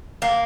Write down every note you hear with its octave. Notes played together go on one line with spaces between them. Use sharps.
A#3